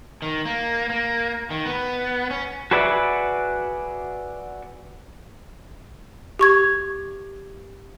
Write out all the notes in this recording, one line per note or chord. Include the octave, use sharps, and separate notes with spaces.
D#3
A#3
A#3
D#3
B3
C#4
F#4 G#4 B4 D5 E5 F#5
G4 C#6 G#6